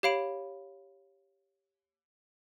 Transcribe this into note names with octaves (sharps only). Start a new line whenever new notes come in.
G4 C#5 F5 B5 D7